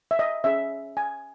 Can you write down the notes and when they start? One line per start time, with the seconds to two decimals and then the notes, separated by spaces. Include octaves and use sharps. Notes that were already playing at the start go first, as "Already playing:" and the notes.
0.11 E5
0.19 D#5
0.44 C#4 G#4 C#5 E5
0.97 G#5